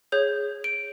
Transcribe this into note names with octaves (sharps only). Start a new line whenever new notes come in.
G#4 C#5 G6
D7